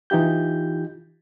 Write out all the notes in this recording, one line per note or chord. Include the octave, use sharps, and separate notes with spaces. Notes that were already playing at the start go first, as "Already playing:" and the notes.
E3 D#4 F4 G4 G6